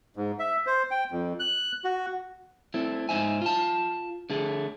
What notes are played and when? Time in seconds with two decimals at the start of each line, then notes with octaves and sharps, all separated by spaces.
0.16 G#2
0.39 E5
0.66 C5
0.91 G5
1.12 F2
1.39 F#6
1.84 F#4
2.74 A3 C4 E4
3.09 G#2 B2 D#4 C5 E5 G#5
3.42 F4 A5
4.30 D3 A3 G#4